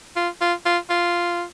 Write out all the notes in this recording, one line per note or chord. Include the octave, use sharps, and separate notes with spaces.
F4
F4
F4
F4